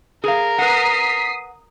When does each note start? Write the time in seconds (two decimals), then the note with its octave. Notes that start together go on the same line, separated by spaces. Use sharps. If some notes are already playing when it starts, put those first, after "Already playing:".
0.24 G#4 A#4 F5
0.58 B4 F#5 D#6 B6 C7